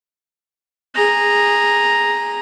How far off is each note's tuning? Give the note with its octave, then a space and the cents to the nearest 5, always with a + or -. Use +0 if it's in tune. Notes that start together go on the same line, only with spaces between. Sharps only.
G#4 -15 A#5 +0